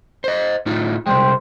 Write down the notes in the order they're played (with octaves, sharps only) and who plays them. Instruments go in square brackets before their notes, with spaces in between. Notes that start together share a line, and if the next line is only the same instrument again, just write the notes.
[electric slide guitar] C5 D#5
A2 D#4 F4
[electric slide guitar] C3 G3 G#3 [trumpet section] C5 G5